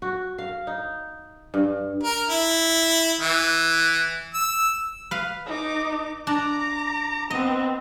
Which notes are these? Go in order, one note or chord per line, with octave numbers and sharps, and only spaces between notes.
F#4
F5
D#4
G2
A#4
E4
E3
E6
B4 F5
D#4 D6
D4 A#5 D6
B3 C4 D#5